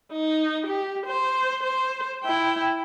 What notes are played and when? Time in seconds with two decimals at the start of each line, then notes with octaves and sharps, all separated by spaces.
0.12 D#4
0.67 G4
1.06 C5
1.64 C5
2.24 E4 G5